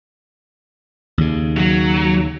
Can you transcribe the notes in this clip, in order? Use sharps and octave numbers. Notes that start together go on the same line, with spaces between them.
D#2 C#3
F#3